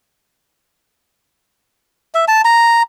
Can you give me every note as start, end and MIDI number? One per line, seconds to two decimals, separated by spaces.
2.14 2.25 76
2.28 2.42 81
2.45 2.82 82